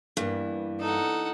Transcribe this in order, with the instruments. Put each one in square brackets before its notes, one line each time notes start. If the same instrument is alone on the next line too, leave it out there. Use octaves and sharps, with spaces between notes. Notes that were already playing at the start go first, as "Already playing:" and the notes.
[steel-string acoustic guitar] G2 [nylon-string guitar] E3 A#3 B3
[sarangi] D#4 [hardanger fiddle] A4 F#5